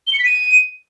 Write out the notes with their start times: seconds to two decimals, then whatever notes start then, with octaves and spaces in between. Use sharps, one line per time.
0.07 G7
0.13 C#7
0.19 B6
0.25 D#7